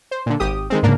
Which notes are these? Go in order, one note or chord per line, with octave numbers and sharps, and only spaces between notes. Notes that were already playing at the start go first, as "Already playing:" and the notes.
C5
A#2 D3
G#1 G4 D#6
D#3 G#3 C4
G#2 C#3 A#3 D4 A#4